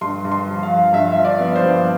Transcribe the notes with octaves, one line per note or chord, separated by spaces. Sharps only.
G2 C6
G2
C6
F3
F5
F3
G2 E5
F3 E5
D5
B3
C5
G2